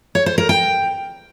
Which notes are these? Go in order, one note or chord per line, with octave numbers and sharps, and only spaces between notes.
C#5
C5
A#4
G5